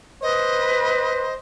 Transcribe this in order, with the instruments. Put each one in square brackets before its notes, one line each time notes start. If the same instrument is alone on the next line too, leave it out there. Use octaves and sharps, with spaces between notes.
[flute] B4 [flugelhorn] C5 [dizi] D#5